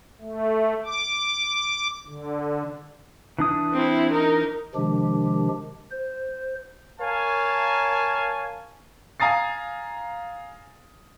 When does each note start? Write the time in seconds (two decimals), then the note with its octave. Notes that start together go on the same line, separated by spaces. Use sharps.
0.20 A3
0.85 D6
2.07 D3
3.38 E3 D4 D#6
3.74 C4 E4
4.12 D#4 A#4
4.75 C3 D#3 F3 G#3 D4 G4
5.91 C5
7.00 A#4 C#5 F5 G#5 A5
9.20 F5 G#5 A#5 D#6 A6 C7